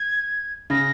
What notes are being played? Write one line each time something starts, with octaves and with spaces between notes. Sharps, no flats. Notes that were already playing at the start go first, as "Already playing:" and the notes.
Already playing: G#6
C#3 A#6